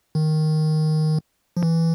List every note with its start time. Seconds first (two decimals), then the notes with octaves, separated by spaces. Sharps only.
0.15 D#3
1.57 F3
1.63 E3